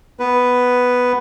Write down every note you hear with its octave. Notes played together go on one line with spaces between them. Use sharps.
B3 B4